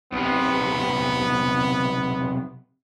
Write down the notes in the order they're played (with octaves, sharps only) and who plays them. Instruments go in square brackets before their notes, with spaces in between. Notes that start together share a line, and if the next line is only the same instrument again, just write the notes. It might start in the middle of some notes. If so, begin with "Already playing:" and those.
[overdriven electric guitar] B1 C3 [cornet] B3